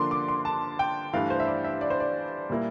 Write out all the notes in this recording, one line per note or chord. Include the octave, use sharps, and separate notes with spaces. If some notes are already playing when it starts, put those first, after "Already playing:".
Already playing: D3 F3 A#3 D4 C6 D6
D6
C6
A5
G5
G2 E3 A3 D4 F5
C5
E5
D5
E5
D5
C5
D5
A#2 G3 A#3 E4